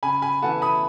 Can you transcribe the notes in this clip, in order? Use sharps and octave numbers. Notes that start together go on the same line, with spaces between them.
C#3 G#5 B5
G#5 B5
E3 A3 F#5 A5
B5 D#6